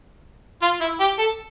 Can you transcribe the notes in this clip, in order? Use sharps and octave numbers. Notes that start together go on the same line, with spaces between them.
F4
E4
G4
A4